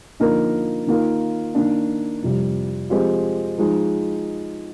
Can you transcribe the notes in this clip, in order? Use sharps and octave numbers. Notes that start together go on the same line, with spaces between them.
D3 F3 A#3 D#4 A#4
D#3 A#3 F4 A#4
D#3 A#3 D4
F2 C3 G3
F3 G#3 C4 G4 C5
F3 G#3 D#4